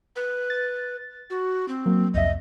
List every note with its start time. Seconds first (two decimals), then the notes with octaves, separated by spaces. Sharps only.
0.16 B4
0.50 A6
1.30 F#4
1.68 C4
1.86 F#3 A#3
2.14 C2 F2 D#5 E5